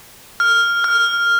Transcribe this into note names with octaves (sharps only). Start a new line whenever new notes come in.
F6
F6